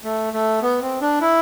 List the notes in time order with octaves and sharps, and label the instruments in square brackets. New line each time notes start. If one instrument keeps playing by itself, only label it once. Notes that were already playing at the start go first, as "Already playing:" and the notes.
[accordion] A3
A3
B3
C4
D4
E4